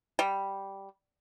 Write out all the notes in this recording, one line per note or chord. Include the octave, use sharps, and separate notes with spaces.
G3